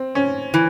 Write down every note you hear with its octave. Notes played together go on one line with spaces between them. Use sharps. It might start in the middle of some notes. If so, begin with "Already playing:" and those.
Already playing: C4
C#4
E3